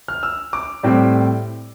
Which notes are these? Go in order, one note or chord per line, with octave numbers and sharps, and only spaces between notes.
F6
E6
D6
A2 G3 C4